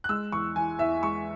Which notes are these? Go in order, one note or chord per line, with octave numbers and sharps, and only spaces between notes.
F#6
G#3 E6
E2 C#6
E3 G#5
E2 E5
G#3 C#6